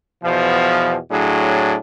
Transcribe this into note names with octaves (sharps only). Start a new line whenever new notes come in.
E2 B2 F3
A2 F#3 D4 G#4